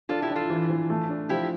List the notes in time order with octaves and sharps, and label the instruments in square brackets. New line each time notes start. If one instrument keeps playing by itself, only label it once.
[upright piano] D4 [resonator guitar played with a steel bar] F4 A4
[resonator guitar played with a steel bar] E4 G4
[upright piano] D4
[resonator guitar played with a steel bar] F4 A4
[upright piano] E3
E3
A3
D4
[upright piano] F3 [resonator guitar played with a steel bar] E4 G4